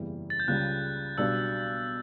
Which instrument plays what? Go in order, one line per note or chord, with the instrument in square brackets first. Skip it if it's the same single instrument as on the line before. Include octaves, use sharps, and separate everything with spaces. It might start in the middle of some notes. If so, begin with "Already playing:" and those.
Already playing: [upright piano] F#1 E2 C#3 E3 G3
[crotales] A6
G6
[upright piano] C#2 C#3 G3 [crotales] F#6
[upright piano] B1 B2 G3 D4 [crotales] E6